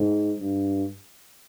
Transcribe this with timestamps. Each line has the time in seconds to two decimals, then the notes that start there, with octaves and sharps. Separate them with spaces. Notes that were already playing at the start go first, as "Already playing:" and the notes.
Already playing: G#2
0.39 G2